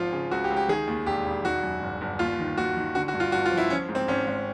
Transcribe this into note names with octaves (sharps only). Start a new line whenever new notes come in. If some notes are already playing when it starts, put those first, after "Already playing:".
Already playing: G#1 F3 F4
C#3
C#2 F#4
G4
C#2
G4
D#3 G#4
D#2
E1 G4
E1
D#3 F#4
F#2
G1
G1
D#2 F4
D#3
D#2 F#4
D#3
D3 F#4
F#4
G2
F4
G1 F#4
F4
F3
E4
F3 C#4
G#2
C4
G#1 C#4
G#1